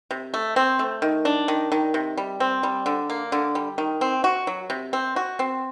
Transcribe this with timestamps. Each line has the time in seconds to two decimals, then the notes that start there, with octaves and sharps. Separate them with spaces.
0.11 C3
0.34 A3
0.56 C4
0.79 A3
1.02 D#3
1.25 D4
1.48 D#3
1.72 D#3
1.94 C3
2.17 G3
2.40 C4
2.63 G3
2.86 D3
3.10 A#3
3.32 D3
3.55 G3
3.78 D#3
4.01 C4
4.24 F#4
4.47 F#3
4.70 C3
4.93 C4
5.16 F#4
5.39 C4